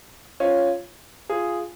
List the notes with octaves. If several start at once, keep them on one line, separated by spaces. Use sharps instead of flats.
C#4 F4
F4 G#4